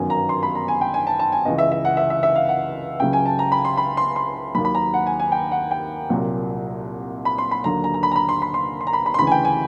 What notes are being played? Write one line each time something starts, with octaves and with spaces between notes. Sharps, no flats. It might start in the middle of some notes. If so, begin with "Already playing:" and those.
Already playing: G1 F#2 D#3 F#3 G#5
A#5
C6
B5
A#5
G#5
G5
G#5
A5
A5
G#5
C#2 C#3 E3 D#5
E5
E5
F#5
E5
E5
E5
F5
F#5
C#2 C#3 F#3 G5
G#5
A5
A#5
B5
C6
B5
C6
C6
D#2 D#3 F#3 B5
B5
A#5
F#5
G#5
G#5
G5
F#5
G5
C2 A#2 F#3
B5
C6
B5
D#2 D3 F#3 A#5
A#5
A#5
B5
A#5
B5
C6
B5
C6
C6
A#5
B5
B5
C6
D2 C#3 E3 B5
G#5
G5
G#5